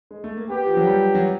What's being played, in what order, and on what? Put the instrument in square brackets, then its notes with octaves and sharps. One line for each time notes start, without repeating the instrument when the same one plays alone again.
[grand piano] G#3
A3
A#3
[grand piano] B3 [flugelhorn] G4
[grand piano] F3
F#3
G3
F#3